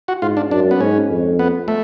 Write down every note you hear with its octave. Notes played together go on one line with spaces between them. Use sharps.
F#4
G#2 F4
D4
F#2 D4
B3
G#2 C#4
F2
B3
A3